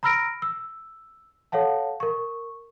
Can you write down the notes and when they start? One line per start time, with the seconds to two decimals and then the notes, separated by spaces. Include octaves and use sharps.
0.03 A#5 B5 E6 F6 A#6 D7
0.42 E6
1.52 A4 C#5 F5 F#5 A5
2.00 A#4 C#6